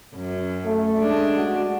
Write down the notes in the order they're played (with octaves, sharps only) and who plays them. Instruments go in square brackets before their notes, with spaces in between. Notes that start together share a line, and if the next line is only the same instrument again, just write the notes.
[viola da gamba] F#2
[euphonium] A3
[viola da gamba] G#3 D4
[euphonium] F#4